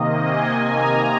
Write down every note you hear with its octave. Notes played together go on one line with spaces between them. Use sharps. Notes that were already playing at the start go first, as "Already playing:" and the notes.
Already playing: C3 D#3 A#3 D#5
G#5
A#5